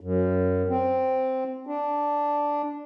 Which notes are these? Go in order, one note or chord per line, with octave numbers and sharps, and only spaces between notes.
F#2
C4
D4